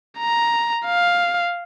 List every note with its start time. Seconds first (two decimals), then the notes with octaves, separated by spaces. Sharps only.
0.18 A#5
0.86 F5